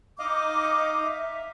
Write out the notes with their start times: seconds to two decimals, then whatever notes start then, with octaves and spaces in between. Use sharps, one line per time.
0.19 D#4 D#5 F5 D6
1.03 E5